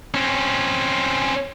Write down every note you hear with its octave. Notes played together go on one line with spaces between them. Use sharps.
C4 C#4